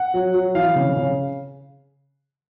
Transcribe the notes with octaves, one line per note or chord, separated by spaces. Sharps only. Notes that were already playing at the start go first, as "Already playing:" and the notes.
Already playing: F#5
F#3
F#3
E3 F5
C#3
C#3